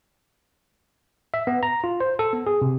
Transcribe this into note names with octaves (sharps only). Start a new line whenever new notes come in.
E5
B3
A#5
F4
C5
A4
B3
G#4
C3